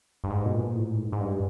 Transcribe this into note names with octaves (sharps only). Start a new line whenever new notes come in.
G2
G#2
B2
A#2
A2
G#2
G#2
G2